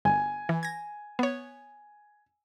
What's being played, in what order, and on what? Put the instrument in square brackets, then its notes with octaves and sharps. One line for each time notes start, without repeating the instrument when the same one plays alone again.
[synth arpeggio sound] G1 [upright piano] G#5
[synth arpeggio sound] E3
G#6 A#6
B3 C#5